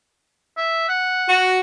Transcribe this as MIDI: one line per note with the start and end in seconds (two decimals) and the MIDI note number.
0.57 0.86 76
0.88 1.40 78
1.29 1.60 66